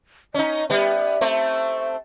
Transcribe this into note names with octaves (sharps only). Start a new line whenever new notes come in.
C#4 D#4 D#5
G3 B3 E5
A3 C4